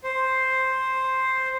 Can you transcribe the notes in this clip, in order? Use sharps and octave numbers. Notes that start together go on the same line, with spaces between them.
C5